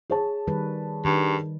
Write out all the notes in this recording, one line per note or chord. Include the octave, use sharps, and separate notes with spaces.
G#4 C#5 A5
D#3 G3 B4
G2 D#3